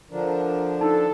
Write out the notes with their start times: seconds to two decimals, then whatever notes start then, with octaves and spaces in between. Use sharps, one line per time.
0.11 D3 F3 D4 A#4
0.81 D#4 A4 A5